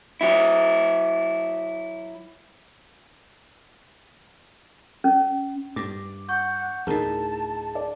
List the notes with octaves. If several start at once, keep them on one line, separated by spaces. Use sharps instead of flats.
F#3 E4
C#4
G2 D6
F#5 C#6 G6
D2 A2 D#4 G#4 A#4 A5
D5